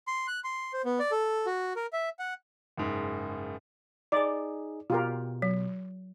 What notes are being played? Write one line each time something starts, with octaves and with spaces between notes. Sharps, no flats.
C6
F#6
C6
C5
B3
D5
A4
F#4
A#4
E5
F#5
F#1 G#2
D#4 G#4 D5
B2 F4 G4 A#4
F#3